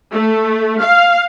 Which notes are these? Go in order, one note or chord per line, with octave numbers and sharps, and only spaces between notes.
A3
F5